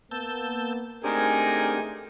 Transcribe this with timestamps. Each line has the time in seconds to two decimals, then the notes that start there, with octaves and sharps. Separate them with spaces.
0.11 A#3 B3 A5 E6 G6
1.04 A3 C4 D4 D#4 G4 G#4 A#4 G#5